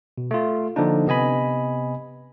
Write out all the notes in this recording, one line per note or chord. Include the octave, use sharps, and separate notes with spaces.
B2
A3 F4
D3 F3 A#3 D4 D#4
C3 B3 D#5 G#5 B5